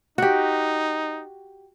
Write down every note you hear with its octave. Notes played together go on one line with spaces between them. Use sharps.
D#4 F#4 G4